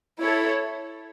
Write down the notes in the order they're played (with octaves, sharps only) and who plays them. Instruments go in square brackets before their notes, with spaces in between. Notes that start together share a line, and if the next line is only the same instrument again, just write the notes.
[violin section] E4 A4 C#5